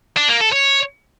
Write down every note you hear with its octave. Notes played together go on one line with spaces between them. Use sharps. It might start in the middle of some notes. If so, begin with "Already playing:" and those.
D4
A#3
A4
C#5